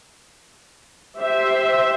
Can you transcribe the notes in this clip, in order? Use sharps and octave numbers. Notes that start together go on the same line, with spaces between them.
G4 C5 E5